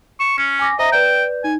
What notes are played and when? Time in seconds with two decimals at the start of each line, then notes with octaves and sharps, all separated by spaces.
0.20 C#6 E7
0.38 C#4 C#7
0.59 G#5 D6 A#6
0.79 C5 D#5 E5 A#5
0.92 B4 D5 G5 G6
1.44 D#4 G#5